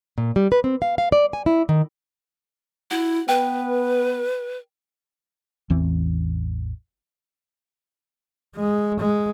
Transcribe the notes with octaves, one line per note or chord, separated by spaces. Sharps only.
A#2
G3
B4
C4
F5
F5
D5
G#5
E4
D#3
E4 F#4
B3 B4 G5
A1 E2 E3 C4
G#3
G#3